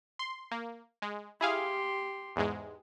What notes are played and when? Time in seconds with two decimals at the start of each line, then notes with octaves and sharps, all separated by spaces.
0.19 C6
0.51 A#3
1.02 G#3
1.41 E4 G4 G#4 F5 C6
2.36 E2 G#2 G#3